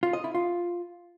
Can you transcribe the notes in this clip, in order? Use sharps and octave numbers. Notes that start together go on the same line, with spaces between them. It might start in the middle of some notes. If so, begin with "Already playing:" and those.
F4
D#5
E4
F4